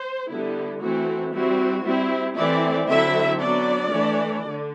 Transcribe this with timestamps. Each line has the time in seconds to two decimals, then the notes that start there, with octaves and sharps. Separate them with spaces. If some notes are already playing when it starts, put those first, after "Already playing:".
Already playing: C5
0.30 D3 G3 B3 E4
0.81 E3 A3 C4 E4 F#4
1.33 G3 C4 E4 F#4
1.84 G3 C4 E4
2.36 E3 A3 C4 E4 D5
2.88 D3 F#3 C4 E4 E5
3.39 F#3 B3 D4 D5
3.91 E3 A3 D4
4.43 D3